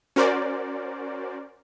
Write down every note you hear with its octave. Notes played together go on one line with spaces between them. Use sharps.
C#4 F#4 A#4 C5 D5